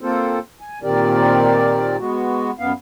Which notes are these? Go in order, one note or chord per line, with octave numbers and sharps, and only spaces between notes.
A#3 C4 F4 A4 C5
G#5
A#2 D#3 C4 G4 A#4 D5
G#3 B3 F#4
F#2 B3 F5